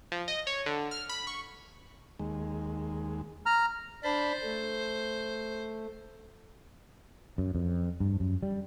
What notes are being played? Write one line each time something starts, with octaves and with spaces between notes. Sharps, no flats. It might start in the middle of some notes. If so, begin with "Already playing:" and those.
F3
D#5
C#5
D3
F6
B5
C#6
D#2 G#3
A#5 F6
D4 C5 A5 B5
A3
F#2
F2
G2
F#2
G3